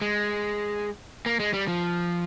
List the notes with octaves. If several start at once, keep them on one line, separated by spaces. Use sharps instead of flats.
G#3
A#3
G#3
G3
F3